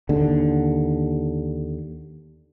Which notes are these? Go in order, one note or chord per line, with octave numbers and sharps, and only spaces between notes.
D#2 D3